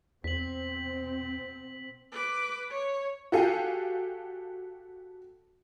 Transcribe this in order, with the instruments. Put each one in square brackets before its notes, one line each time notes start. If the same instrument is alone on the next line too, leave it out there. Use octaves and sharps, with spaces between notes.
[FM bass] E2 [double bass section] B2 C4 [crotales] B6 F#7
[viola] B4 D6
C#5
[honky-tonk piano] F#4 G4 A4 F5 G5 G#5